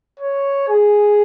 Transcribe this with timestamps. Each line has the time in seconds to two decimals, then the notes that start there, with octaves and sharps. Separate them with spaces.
0.20 C#5
0.69 G#4